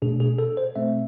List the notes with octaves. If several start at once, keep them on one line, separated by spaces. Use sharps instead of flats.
B2 A3 D4 G#4
G#4
A4
C5
B2 A3 C4 E5